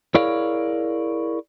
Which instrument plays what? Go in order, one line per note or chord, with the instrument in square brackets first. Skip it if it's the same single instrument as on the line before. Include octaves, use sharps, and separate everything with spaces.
[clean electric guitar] E4 G#4 A#4 C#5 D5 F5